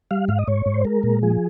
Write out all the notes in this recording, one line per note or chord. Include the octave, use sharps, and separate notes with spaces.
G3 F5
G#2 F5
D#5
G#2 C#5
G#2
C5
G#3 A#4
A#2
F3 G#4